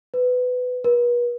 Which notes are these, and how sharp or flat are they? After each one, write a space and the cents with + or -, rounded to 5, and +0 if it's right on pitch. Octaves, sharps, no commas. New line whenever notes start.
B4 +20
B4 -40